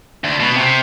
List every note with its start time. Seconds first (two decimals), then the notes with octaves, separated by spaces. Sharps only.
0.24 D2
0.40 B2
0.57 C3